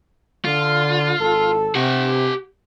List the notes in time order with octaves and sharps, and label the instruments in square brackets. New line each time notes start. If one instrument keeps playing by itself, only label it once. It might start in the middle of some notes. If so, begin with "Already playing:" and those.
[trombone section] D3 [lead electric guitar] F4
[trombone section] G#1 A4
[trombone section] C3 [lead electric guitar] G4 F#5